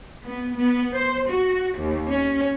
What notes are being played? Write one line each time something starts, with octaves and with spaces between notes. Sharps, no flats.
B3
B3
C5
F#4
D#2
C#4